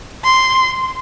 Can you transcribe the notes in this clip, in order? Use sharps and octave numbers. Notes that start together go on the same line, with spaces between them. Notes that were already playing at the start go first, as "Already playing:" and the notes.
C6